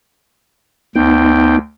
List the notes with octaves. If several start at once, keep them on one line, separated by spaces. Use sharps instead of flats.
D2 B3 D#4 G5